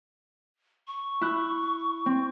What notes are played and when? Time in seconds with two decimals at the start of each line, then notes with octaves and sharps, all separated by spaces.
0.87 C#6
1.21 E4 F#6
2.06 C4